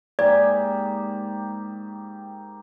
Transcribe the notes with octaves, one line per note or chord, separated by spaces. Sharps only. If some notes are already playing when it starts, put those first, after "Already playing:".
G#2 A#3 G4 D5